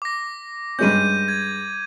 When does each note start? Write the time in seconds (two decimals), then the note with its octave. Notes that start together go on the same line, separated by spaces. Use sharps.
0.02 D6 A#6
0.79 G2 G#3 C#4 G6 D#7
1.28 G#6